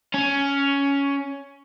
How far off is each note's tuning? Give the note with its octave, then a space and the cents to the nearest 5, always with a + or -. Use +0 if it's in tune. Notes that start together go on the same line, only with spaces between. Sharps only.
C#4 +10